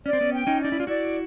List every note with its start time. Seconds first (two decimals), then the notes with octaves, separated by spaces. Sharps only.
0.06 C#4 D5
0.13 C4
0.21 B3 C#4
0.33 G5
0.47 C#4 D#4
0.60 D#4 D5
0.72 E4
0.80 F4
0.87 E4 F#4 D5